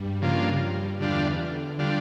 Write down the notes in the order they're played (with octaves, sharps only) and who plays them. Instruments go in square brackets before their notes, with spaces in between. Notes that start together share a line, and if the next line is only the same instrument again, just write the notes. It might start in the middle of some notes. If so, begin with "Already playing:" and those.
Already playing: [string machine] G2 G3
[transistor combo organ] C#3 F3 A#3 D4 F4
[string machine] E2 E3 [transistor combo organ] D3 G3 D4 F4
[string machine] D3
[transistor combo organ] D3 G3 D4 F4